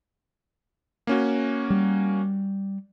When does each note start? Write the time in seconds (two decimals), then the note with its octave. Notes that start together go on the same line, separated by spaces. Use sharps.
1.07 A#3 C#4 F#4
1.70 G3